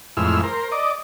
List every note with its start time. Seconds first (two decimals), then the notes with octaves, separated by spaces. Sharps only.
0.17 F2 A2 E3 G#3 E6 F6
0.43 A#4 C5
0.72 D5 D#5